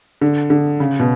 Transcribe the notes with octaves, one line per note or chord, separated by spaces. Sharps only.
D3
D3
C#3
B2